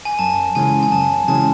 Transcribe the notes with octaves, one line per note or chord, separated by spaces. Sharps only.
G#5
F#2 A5
C#3 E3 G#3 C#4 G#5
G#5
F#2 A5
C#3 E3 G#3 C#4 A5